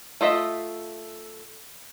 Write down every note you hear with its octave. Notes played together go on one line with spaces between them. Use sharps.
A3 F4 D#5 E5